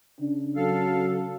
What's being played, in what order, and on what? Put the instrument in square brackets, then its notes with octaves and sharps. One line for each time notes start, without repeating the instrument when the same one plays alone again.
[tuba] C#3 [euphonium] D4
[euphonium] F#3 [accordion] A4 F5